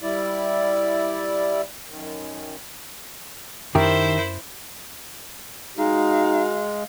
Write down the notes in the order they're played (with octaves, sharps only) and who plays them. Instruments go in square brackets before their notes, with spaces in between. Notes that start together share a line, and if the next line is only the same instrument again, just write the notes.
[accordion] G3 E4 D5
F#2 D#3
[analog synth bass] F#2 [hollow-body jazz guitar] D#3 G4 [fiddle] E4 C5 [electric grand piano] A#4 E5
[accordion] G#3 [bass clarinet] D#4 [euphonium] F#4 [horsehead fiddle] F5